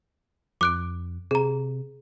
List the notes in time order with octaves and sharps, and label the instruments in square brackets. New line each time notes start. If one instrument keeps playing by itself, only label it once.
[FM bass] F2 [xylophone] D6 F#6 D7
[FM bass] C3 [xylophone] G#4 A#5